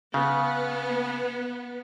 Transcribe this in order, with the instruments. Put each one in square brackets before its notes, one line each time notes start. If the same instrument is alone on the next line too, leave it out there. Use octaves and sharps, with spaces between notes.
[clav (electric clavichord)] C#3 [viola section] B3